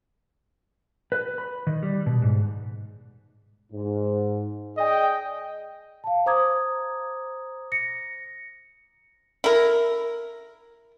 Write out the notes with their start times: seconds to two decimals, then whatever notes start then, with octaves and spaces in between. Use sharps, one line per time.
1.12 B4
1.38 B5
1.67 D#3
1.83 G3
2.06 B2
2.22 G#2
3.72 G#2
4.77 G#4 D5 D#5 G5
6.04 F5 A5
6.26 C5 A#5 D6 D#6 G#6
7.72 A#6 C#7
9.44 E4 A#4